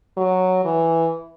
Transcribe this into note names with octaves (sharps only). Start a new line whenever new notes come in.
F#3
E3